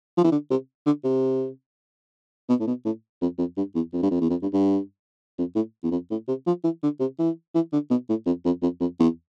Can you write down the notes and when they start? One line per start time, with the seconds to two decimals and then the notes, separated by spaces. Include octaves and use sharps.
0.17 F3
0.24 E3
0.32 D3
0.51 C3
0.86 D3
1.04 C3
2.49 B2
2.60 A2
2.67 B2
2.85 A2
3.22 F2
3.38 F2
3.57 G2
3.75 E2
3.93 F2
4.02 G2
4.11 F2
4.21 E2
4.30 F2
4.42 G2
4.53 G2
5.38 F2
5.55 A2
5.83 E2
5.91 F2
6.10 A2
6.28 C3
6.47 F3
6.64 E3
6.83 D3
7.00 C3
7.19 E3
7.55 E3
7.73 D3
7.90 B2
8.09 A2
8.26 F2
8.45 F2
8.62 F2
8.80 F2
8.99 E2